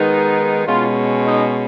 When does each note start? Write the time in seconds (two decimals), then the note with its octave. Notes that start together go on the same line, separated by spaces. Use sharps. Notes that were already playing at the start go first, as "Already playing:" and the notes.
Already playing: D#3 G#3 B3 D#4
0.66 B2 G#3 C#4 F4
1.25 D#4